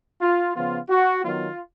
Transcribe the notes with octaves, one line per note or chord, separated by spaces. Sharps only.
F4
C#3 F3 B3 F4
F#4
D#3 F#3 B3 F4